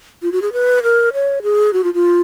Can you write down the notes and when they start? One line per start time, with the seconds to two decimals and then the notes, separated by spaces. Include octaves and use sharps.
0.22 F4
0.32 F#4
0.42 G#4
0.53 B4
0.83 A#4
1.13 C#5
1.43 G#4
1.73 F#4
1.84 F4
1.94 F4